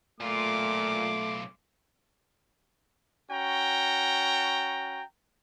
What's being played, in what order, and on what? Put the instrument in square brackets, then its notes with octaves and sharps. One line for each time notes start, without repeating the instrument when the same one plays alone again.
[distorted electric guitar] B1 F4 [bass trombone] A#2 [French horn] A3 [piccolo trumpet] D6
[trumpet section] C#4 F#4 G5 A#5